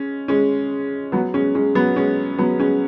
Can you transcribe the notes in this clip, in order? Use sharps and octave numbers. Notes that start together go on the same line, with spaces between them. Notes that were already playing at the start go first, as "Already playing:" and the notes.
Already playing: G#3 C#4
G#3 C#4
F#3 B3
G#3 C#4
G#3 C#4
F#3 B3
G#3 C#4
F#3 B3
G#3 C#4